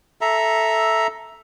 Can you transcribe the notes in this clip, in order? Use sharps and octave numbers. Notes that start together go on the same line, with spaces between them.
A4 E5 A#5